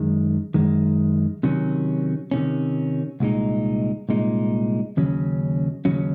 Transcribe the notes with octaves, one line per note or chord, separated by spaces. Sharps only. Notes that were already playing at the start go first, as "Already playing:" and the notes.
Already playing: F#2 D#3 G#3
F#2 D#3 G#3
C3 D#3 F#3 C#4
C3 D#3 F#3 C#4
C2 A#2 G#3 D#4
C2 A#2 G#3 D#4
D#2 C#3 F#3 C#4
D#2 C#3 F#3 C#4